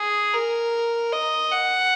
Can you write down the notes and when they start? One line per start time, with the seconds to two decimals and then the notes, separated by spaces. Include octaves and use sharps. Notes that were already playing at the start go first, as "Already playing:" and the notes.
Already playing: G#4
0.34 A#4
1.13 D#5
1.52 F#5